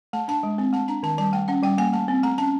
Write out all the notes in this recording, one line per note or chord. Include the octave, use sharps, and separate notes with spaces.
A3 A5
D4 A5
G#3
C4
A3 A5
D4 A#5
D#3 A5
G3 A5
A3 G5
C#4 F#5
G3 G5
A#3 G#5
A3 A5
C4
A3 A#5
C#4 A5